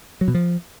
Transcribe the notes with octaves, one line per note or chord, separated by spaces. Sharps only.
F#3
B2
F3